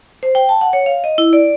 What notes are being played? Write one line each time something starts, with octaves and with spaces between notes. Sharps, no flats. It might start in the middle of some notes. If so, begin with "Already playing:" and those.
C5
G5
A5
F#5
C#5
F5
D#5
E4
D5